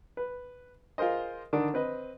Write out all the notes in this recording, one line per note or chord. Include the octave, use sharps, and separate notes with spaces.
B4
F4 G#4 A#4 C5 D#5
D3 D#3 D4
C4 B4 D#5